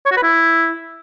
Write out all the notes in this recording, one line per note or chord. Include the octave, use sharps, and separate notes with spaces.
C#5
F#4
B4
E4